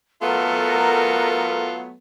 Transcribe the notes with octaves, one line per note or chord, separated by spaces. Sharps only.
F#3 A3 B3 F4 A4 A#4